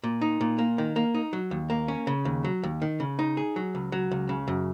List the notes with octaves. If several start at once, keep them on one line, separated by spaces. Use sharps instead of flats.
A#2
D#4
A#2
A#3
D#3
A#3
D#4
F#3
D#2
A#3
C#4
C#3
D#2
F#3
D#2
D#3
C#3
D#4
G#4
F#3
C#2
F#3
C#2
C#3
F#2